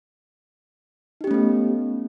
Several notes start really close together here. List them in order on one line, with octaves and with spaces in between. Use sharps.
D#4 G4 C#4 A3 B3